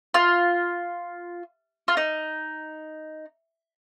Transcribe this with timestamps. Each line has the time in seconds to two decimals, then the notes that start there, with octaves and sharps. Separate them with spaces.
0.14 F4
1.88 F4
1.97 D#4